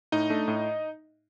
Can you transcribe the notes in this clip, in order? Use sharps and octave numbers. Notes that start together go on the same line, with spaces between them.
A2 D#4 D#5
A3 D4
A2